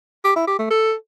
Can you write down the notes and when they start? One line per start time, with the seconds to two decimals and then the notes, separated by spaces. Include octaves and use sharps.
0.25 G4
0.36 E4
0.47 G4
0.59 A3
0.70 A4